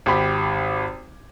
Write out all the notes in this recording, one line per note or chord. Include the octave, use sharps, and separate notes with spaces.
G#1 G4 B5